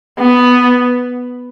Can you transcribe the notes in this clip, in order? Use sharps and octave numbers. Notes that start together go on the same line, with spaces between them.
B3